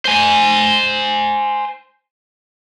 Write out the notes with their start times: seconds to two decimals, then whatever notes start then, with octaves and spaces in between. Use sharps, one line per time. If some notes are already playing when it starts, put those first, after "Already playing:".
0.05 C5 G#5